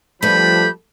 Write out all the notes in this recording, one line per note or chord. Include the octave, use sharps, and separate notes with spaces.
F3 G3 A3 D4 B4 B5 G6